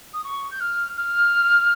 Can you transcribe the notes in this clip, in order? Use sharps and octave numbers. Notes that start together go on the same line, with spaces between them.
D#6
C#6
G6
F6
F6